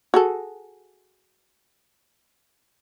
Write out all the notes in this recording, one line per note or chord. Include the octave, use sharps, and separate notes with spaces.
F#4 G#4 A4